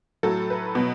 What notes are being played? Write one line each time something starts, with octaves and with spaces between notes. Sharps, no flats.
A2 F#3 A4
B4
B2 F#3